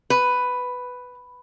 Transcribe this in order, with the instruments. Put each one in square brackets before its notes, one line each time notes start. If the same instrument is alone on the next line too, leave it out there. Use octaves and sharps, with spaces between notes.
[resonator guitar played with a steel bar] B4